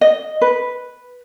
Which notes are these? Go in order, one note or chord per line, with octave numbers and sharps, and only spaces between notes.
D#5
B4